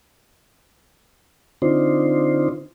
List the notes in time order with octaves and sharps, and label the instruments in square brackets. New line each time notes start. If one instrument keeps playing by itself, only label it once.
[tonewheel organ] D3 C4 D4 D#4 F4 C5